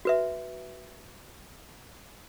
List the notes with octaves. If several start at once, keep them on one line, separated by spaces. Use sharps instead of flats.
F#4 B4 E5